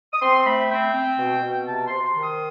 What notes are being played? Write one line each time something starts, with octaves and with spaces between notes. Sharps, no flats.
D#6
C4 C6
A3 B5
C4 G5
C4
B2
B2
C3 A5
C6
C3
C6
D#3
D#6